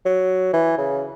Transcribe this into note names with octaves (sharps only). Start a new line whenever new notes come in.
F#3
E3
C#3